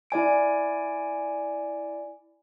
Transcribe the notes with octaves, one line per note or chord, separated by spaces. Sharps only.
E4 D5 G#5 D7